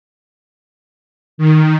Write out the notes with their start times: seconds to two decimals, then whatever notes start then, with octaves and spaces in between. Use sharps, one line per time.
1.38 D#3